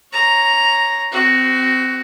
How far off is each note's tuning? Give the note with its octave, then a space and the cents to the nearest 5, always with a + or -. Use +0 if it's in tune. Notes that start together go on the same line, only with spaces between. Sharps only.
C#5 +0 A#5 +0
C4 -20 F#4 +10